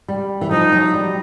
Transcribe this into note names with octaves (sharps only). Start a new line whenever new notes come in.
G3
E3
F3 D#4
F#3
G3